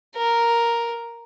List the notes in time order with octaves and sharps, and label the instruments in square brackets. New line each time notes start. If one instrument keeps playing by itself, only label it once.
[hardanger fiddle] A#4